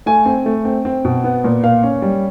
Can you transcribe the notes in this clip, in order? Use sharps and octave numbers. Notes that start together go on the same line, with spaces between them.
A3 G#5
C4
A3
C4
C4
B2
B3
A#2
A#3 F5
C#4
G3